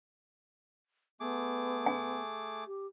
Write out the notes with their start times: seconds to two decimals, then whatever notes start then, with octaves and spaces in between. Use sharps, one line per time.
1.20 A3 B3 G#4 D6
1.86 G#5
2.67 G4